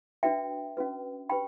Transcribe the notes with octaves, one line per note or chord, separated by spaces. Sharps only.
D4 F#4 B4 E5 G5
C#4 F#4 B4
D4 G4 B4 G5 B5